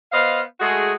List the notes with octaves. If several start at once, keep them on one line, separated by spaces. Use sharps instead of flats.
B3 C5 D#5 F5
G#3 A3 F#4 G#4